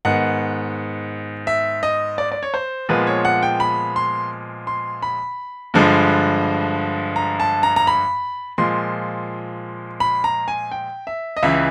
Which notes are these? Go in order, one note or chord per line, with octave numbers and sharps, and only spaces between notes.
G#2 D#3 G#3 B3 F#5
E5
D#5
D5
D5
C#5
C5
A#2 F3 G#3 B3 B4
C#5
F#5
G5
B5
C6
C6
B5
G2 D3 F3 G#3
A#5
A5
A#5
A#5
B5
A#2 F3 G#3 C6
B5
A#5
G#5
G5
E5
D#5
C#2 C#3 E3 E5